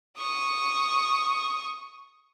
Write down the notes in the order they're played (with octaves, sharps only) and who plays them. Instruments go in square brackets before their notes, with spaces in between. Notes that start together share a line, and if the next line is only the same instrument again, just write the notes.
[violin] C#6 D#6